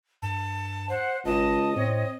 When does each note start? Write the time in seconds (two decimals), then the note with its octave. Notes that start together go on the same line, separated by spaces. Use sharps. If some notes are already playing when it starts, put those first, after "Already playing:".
0.22 G2 A5
0.89 C5 F#5
1.25 G#1 C#2 D#5 A5
1.76 A2 C4 C#5